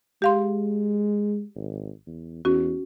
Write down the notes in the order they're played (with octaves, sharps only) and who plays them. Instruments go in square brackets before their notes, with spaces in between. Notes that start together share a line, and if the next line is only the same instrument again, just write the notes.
[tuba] G#3 [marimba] G4 F5 C6
[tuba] G#1
E2
[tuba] E2 [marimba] C#4 F#4